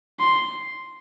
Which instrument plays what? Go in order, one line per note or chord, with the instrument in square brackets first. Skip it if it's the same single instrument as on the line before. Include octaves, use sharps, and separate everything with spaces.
[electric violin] C6